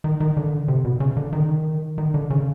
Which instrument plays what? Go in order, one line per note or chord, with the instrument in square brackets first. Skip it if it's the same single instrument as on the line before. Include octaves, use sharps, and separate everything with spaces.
[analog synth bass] D#3
D#3
D3
C3
B2
C#3
D3
D#3
D#3
D3
C#3